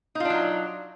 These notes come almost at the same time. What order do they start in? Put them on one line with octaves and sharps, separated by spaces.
D#4 F4 D4 F#3